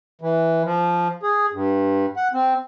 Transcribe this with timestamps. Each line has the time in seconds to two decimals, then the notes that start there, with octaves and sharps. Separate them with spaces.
0.21 E3
0.64 F3
1.23 G#4
1.53 G2
2.17 F#5
2.33 C4